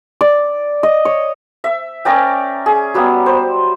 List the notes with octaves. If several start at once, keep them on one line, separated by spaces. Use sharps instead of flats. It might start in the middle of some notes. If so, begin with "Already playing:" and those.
D5
D#5
C#5
E5
C#4 A#4 D5 G5
G#4
F#3 G3 B3
C5